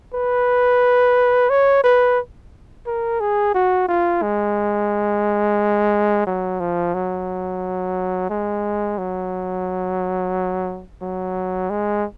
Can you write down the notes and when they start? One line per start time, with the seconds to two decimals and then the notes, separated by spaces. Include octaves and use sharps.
0.14 B4
1.50 C#5
1.84 B4
2.86 A#4
3.20 G#4
3.54 F#4
3.88 F4
4.22 G#3
6.27 F#3
6.60 F3
6.94 F#3
8.30 G#3
8.98 F#3
11.02 F#3
11.70 G#3